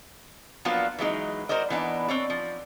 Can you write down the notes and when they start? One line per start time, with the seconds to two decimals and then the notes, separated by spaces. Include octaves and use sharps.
0.65 F3 F#3 A#3 B3 D4 F4
0.99 E3 F#3 G#3 D#4
1.49 F#4 A#4 C5 D5 D#5
1.70 E3 B3 D4 D#4
2.08 C4 C#5 D5
2.30 F3